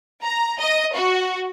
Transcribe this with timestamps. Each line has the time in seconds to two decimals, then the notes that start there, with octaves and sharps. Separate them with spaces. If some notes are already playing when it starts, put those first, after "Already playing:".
0.22 A#5
0.60 D#5
0.95 F#4